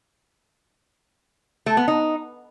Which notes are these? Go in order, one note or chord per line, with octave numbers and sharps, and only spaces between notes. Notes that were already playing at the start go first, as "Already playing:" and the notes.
A3
B3
D#4